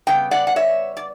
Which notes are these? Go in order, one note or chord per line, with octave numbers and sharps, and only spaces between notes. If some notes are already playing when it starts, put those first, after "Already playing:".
C#3 G3 B3 G5
D5 F#5
F#5
C#5 E5
D5